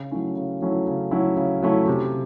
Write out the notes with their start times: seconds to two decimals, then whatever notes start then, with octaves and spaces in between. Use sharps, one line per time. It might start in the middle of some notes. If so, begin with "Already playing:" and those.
Already playing: C#3
0.11 F#3 A3 C#4 E4
0.37 C#3
0.62 F#3 A3 C#4 E4
0.87 C#3
1.11 F#3 A3 C#4 E4
1.37 C#3
1.62 F#3 A3 C#4 E4
1.88 C3